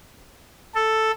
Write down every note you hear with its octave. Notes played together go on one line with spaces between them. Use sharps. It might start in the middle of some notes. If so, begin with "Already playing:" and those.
A4